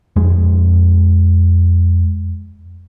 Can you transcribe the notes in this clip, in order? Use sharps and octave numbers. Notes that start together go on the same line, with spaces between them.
F2 G#3